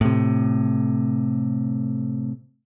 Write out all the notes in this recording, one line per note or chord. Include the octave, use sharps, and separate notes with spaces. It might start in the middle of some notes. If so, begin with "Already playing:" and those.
A2 C3